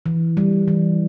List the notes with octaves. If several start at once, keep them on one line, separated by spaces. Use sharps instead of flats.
E3
G3
E3